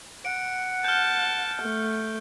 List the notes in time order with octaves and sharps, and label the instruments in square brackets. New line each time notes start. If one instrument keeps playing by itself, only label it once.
[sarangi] F#5 [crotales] D7
[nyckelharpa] A5 [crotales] F6 G6
[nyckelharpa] A3